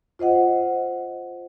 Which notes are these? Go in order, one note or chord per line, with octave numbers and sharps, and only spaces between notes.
F4 C5 D#5 F#5